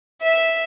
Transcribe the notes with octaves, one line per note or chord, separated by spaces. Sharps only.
E5